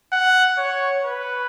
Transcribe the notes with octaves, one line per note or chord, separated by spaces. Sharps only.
F#5
C#5
B4